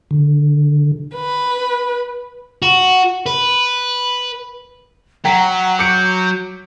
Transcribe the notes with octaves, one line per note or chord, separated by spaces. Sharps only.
D3
B4
F#4
B4
F#3 F#5 G5 A#5 B6
D6 G6 C#7 D7